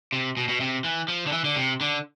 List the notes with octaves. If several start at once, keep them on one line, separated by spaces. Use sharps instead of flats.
C3
B2
B2
C3
E3
F3
D3
E3
D3
C3
D3